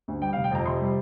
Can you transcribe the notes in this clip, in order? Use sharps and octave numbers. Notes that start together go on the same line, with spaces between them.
D2
G3 G5
F1 F5
G5
F2 A#5
C3 C6
G3